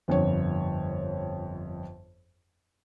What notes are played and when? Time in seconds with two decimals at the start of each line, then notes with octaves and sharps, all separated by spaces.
0.08 G1 F2 C#5